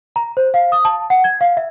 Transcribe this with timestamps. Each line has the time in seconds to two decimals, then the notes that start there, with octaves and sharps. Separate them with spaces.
0.16 A#5
0.37 C5
0.54 F5
0.72 D#6
0.85 A5
1.10 F#5
1.24 G#6
1.41 F5
1.57 E5